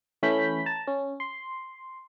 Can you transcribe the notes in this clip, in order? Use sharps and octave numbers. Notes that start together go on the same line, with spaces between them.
E3 A3 C#4 B5 G6 B6
A5 A#5
C#4
C6